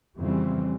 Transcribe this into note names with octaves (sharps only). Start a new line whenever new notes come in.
F2 C#3 E3 G3 C4